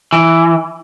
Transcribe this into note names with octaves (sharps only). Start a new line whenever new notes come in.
E3